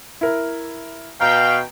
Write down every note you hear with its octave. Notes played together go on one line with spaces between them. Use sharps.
E4 A#4
B2 F5 G5 A#5